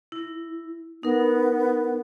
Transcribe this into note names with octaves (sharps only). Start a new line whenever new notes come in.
E4
B3 D#4 A#4